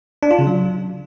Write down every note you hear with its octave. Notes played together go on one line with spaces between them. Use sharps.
D4
F4
C#3
F#3